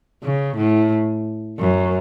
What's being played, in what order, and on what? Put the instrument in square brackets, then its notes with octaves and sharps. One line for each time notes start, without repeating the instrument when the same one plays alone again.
[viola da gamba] C#3
A2
F#2